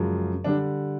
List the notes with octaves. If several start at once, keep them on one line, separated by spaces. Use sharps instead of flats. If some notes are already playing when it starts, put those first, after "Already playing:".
Already playing: F#2 C#3 F3 G#3
D3 G3 D4